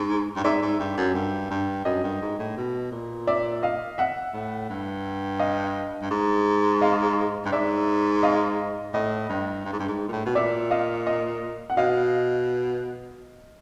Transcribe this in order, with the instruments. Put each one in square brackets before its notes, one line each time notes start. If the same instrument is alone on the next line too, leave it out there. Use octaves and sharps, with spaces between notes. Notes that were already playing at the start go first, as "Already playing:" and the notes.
Already playing: [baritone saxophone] G#2
G2
[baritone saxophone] G#2 [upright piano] D5 E5
[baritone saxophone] G#2
G2
F#2
G2
G2
[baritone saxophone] F#2 [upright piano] D#5
[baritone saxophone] G2
G#2
A2
B2
A#2
[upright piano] D5 E5
D#5 F5
E5 F#5
[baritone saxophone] A2
G2
[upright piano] D#5 F5
[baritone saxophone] G2
G#2
[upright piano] D#5 F5
[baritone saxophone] G2
[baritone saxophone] G#2 [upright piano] D5 E5
[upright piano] D#5 F5
[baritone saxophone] A2 [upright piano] D#5
[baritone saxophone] G2
G2
G#2
G2
G#2
A#2
A2
B2
[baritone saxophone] A#2 [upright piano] D5 E5
[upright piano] D#5 F5
D#5
F#5
[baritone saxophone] B2 [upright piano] D#5 F5